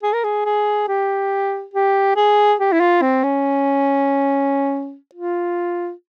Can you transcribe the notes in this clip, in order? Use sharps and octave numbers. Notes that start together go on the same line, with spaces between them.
G#4
A#4
G#4
G#4
G4
G4
G#4
G4
E4
F4
C4
C#4
F4